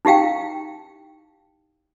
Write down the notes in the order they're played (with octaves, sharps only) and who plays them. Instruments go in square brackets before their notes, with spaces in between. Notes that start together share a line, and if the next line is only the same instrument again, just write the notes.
[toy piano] D#4 E4 G4 F5 G5